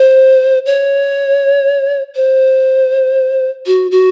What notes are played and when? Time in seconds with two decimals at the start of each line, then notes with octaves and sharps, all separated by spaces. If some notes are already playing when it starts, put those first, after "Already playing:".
Already playing: C5
0.66 C#5
2.16 C5
3.67 F#4
3.91 F#4